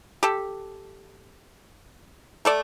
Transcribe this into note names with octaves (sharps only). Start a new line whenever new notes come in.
G4 A4
A3 A4 D5